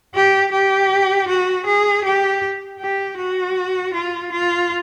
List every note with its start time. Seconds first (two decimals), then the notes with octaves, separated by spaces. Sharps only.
0.15 G4
0.52 G4
1.28 F#4
1.67 G#4
2.05 G4
2.80 G4
3.18 F#4
3.94 F4
4.32 F4